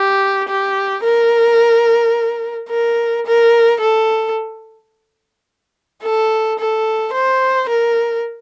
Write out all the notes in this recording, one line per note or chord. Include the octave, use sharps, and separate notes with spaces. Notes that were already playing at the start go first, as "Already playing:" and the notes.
Already playing: G4
G4
A#4
A#4
A#4
A4
A4
A4
C5
A#4